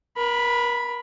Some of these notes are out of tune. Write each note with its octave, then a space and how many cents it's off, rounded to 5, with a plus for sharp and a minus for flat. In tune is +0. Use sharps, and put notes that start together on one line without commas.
A#4 +35 B5 +0